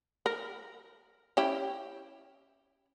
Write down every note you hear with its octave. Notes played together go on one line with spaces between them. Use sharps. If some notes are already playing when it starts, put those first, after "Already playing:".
A#4
C#4 E4 G4